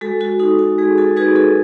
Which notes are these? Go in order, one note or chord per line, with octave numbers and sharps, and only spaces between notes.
G#3 F#4 A4
F#4 A4
D#4 F#4 A4
F#4
G#3 G#4
F#4 A4
D#4 F#4 G#4 B4
F#4 A4